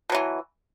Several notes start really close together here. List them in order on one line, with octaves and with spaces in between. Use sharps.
B2 F#3 E3